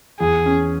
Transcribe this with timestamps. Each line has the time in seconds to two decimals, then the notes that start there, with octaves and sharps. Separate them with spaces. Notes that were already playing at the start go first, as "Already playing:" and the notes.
0.20 E2 G#4
0.46 C#4